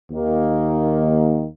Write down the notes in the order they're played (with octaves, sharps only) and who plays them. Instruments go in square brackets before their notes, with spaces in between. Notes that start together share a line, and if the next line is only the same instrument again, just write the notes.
[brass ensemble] D#2 D#3 A#3